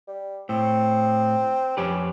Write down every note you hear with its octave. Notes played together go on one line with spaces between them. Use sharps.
G3
A2 C4
F2 C#4 G4 B4